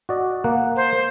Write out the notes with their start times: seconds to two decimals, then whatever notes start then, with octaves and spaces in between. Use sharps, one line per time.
0.09 F#4 D5 D#5
0.44 A#3 F#5
0.76 C5